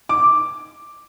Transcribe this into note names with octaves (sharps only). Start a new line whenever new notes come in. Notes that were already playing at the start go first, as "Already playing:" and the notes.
D6